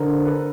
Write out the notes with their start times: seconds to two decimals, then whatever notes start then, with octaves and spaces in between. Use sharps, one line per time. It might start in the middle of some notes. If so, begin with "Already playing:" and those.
Already playing: D3 A#4 C5
0.26 A4 B4